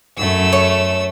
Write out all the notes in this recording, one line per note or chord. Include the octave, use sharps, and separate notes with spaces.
F#2 A3 E6
C#5